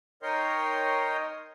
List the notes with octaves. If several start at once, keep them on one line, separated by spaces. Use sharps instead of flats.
D#4 A#4 C#5 D#5 G5 C6